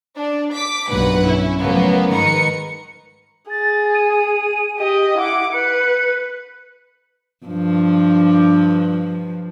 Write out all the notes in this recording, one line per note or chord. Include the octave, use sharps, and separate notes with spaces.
D4
D6 B6
B1 G2 A#2 B4 F#5
C#4 E4
A2 C#3 F3 F#3 A#3 B3
G#2 D#3 A#4 B4 C#7
G#4 A6
D#7
G4 D#5
E4 F#5 D6
B4 C#7
G2 F3